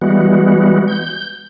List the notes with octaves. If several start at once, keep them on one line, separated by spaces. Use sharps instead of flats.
E3 G3 G#3 B3 F#4
G6